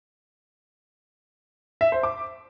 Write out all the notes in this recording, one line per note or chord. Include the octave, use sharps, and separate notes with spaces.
E5
C5
D6